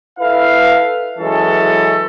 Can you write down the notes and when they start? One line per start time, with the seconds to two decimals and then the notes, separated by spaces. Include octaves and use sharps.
0.19 E4 A4 B4 F5
1.19 E3 F#3 G#3 C#4 A4